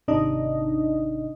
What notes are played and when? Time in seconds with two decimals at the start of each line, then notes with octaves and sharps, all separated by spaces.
0.08 G#1 C3 D4 D#4 D#5